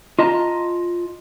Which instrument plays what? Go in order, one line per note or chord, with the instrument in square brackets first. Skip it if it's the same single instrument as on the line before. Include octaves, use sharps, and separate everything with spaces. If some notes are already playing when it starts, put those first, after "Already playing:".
[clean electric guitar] F4 D#5 A5 A#5